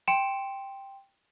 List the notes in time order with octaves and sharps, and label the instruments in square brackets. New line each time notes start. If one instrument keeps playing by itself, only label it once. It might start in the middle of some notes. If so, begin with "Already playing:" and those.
[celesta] G5 C6 C#7 D7 E7